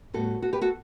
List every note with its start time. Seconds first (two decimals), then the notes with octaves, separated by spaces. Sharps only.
0.14 A2 G3 B3 F#4 A4
0.42 F#4 A4
0.53 G4 B4
0.61 F#4 A4